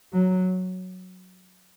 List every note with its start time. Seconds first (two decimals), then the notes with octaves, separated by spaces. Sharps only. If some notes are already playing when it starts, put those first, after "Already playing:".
0.13 F#3